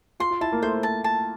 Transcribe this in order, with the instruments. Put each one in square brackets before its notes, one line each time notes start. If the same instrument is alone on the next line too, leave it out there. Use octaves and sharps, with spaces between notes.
[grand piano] F4 [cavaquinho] C6
[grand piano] F4
[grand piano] E4 [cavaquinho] A5
[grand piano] A#3
[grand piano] A3 [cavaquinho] C5
[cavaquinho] A5
A5